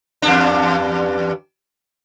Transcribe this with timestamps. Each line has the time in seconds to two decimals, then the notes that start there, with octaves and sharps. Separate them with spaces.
0.22 E2 G2 D4